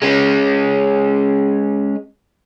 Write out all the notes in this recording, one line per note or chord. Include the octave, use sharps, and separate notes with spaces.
G#3 C#4